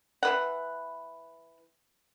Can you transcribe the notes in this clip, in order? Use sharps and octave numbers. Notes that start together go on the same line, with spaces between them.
E3 B4 F#5